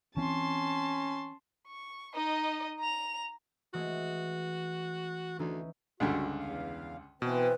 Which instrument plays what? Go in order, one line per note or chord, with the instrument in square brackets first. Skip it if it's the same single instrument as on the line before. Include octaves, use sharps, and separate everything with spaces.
[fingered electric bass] E3 C4 [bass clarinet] C#4 [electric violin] A5 C6
[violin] C#6
D#4 D#5
A#5 F7
[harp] E3 G#3 A3 [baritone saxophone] F#4
[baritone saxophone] D2 [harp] E3 C#4 D#4
[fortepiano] C#2 G2 D3 [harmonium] F#4
[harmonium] E2 F5
[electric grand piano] B2 [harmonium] E3 C4 [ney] B4